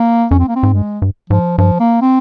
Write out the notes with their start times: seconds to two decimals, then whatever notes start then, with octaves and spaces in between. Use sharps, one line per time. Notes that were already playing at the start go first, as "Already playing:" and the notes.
Already playing: A#3
0.31 F2 C#4
0.39 C4
0.48 A#3
0.56 C4
0.63 G#2
0.73 G2 G#3
1.02 G2
1.30 G#2 F3
1.58 G2 F3
1.80 A#3
2.02 C4